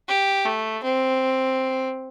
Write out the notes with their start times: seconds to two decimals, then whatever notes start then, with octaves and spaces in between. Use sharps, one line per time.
0.09 G4
0.46 A3
0.84 C4